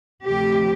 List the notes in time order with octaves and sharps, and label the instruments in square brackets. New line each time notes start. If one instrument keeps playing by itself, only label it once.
[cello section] D2 C3 F3 A3 G4